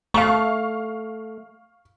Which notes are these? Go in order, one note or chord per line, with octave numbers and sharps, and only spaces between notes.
A3 F5 C#6